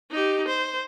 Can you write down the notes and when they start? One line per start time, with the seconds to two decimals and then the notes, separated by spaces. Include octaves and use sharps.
0.11 D#4 G4
0.48 C5